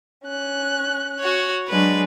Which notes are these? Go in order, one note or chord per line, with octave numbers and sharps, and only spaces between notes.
C#4 F#6
F#4 C#5
F#3 G#3 D4 B4